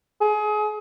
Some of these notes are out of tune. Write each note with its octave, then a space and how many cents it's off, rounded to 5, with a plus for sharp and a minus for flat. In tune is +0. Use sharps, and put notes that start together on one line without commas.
G#4 +30